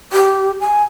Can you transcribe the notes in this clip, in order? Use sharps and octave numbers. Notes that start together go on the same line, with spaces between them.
G4
G#5